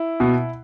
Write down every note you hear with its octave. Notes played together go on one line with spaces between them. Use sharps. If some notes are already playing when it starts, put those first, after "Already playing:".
Already playing: E4
B2